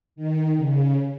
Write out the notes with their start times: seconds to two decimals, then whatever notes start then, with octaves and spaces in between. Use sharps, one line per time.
0.16 D#3
0.57 C#3